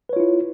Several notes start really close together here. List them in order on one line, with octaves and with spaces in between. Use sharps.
B4 C#5 F4 E4